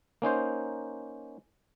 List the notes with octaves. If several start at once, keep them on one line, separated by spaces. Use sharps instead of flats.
A#3 C#4 D#4 C5